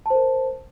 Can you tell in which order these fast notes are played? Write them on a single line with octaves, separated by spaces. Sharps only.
A5 C5 A#4